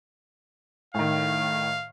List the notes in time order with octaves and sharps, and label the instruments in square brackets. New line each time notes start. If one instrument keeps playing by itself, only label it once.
[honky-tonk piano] A2 D#3 [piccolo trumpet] F5